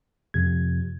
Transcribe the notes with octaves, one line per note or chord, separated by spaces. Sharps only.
F2 C3 G#6